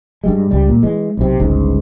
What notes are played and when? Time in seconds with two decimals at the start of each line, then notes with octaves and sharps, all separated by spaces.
0.24 G2 G3 G#3
0.51 C#2 G3
0.69 A#2
0.83 E3 G#3
1.17 B1 C3
1.40 G1 C#2 G#2